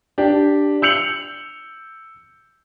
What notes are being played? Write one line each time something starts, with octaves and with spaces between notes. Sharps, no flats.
D4 G4
E6 G6 C#7 F7 F#7